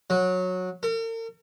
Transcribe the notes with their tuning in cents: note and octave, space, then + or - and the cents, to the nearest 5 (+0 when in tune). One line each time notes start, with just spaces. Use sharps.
F#3 -15
A#4 -45